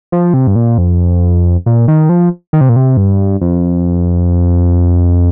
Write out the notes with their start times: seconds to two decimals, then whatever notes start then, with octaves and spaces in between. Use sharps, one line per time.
0.12 F3
0.34 C3
0.47 G2
0.56 A#2
0.78 F2
1.66 A#2
1.88 D#3
2.09 F3
2.53 D#3
2.61 C3
2.69 A#2
2.76 C3
2.97 G2
3.41 F2